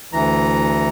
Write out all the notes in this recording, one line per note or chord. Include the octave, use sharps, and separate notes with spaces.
D2 E3 A#5